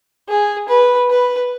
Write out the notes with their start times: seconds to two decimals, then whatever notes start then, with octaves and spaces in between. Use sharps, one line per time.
0.28 G#4
0.69 B4
1.10 B4